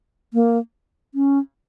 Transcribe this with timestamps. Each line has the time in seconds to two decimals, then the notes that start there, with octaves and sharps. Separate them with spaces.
0.34 A#3
1.15 C#4